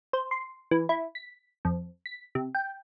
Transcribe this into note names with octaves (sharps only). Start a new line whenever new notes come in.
C5
C6
E3
E4
B6
F2
B6
C3
G5